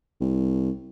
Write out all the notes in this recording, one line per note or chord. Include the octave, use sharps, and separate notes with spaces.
C2